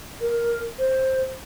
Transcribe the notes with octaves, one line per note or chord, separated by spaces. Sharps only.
A#4
C5